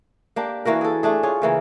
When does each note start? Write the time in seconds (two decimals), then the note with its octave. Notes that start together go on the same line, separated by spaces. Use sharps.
0.36 A#3 D4 G4
0.65 E3 A#3 F#4 A#4
0.81 G#4 A4
1.03 A3 D4 G#4
1.23 F4 G#4 C#5
1.42 C#3 E3 A#3